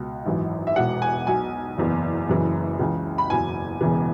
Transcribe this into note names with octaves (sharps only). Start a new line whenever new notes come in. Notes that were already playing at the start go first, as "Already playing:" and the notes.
Already playing: C#2 B2
G#1 F#2 E3
E5
E1 E2 B2 F#5
G#5
B1 B2 G#5
F#1 E2 E3
F#1 F#2 C#3 E3
C#2 C#3 E3
B5
F#1 E2 B2 G#5
E1 E2 C#3 E3